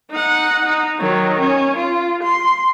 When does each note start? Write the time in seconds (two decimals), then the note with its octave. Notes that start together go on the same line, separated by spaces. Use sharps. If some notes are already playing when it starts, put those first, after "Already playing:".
0.11 D#4 F#5
0.66 D#4
1.00 D#3 F#3
1.40 C#4
1.77 F4
2.24 C6